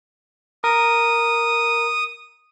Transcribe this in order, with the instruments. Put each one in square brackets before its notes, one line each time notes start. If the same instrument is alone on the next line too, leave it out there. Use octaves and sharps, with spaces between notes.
[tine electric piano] A#4 [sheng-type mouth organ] D#6